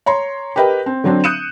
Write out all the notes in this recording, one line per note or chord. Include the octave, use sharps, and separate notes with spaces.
C#5 A#5 C6
G4 A#4 B4 D#5 G5
C4
D3 F#3 C4 D4
D#6 F#6 G6 C#7 D#7 E7